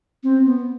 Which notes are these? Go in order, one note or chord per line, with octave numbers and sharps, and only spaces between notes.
C4
B3